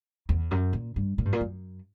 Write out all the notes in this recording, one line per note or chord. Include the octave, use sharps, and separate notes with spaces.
E2
F#2
A#2
G2
A#2
G2
A#2
F#2